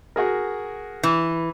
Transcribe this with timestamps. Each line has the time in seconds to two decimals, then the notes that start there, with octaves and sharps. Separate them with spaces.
0.16 F#4 G#4 A#4
1.03 E3